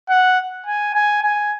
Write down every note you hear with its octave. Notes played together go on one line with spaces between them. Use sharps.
F#5
G#5
G#5
G#5